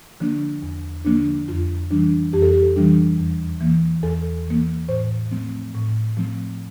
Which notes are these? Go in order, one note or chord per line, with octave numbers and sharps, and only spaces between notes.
D3 F3 A#3 D4
E2
D3 F3 A#3 D4
F2 F4
E3 G3 D4
F2 G4
A4
G4
E3 G3 D4
E2
E3 A#3
E2 A4
E3 A#3
A2 C5
F3 A3 C4
A2
F3 A3 C4